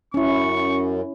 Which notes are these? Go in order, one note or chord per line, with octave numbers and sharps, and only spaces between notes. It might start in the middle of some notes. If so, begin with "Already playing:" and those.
F#2 C#4 E4 C#6